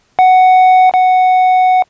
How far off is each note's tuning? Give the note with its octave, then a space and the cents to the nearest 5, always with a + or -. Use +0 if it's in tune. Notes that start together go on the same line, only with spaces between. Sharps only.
F#5 +5
F#5 +0